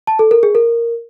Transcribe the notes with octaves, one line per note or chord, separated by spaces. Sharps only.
A5
A4
A#4
G#4
A#4